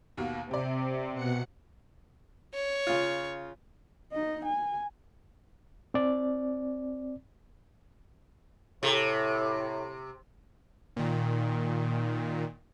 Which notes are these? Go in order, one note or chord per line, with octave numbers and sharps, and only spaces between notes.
D#2 B2 A#3
C3 G4 D5
B2 F#5 C#7
C#5
C#3 F4
D#4 D#5
G#5
C4 D5
A2 C3
A#2 D#3